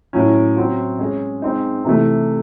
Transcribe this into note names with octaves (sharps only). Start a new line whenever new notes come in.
A2 F#3 C#4
F#3 C4 F#4
G#3 C#4 G#4
G#3 C4 D#4
C3 E3 A3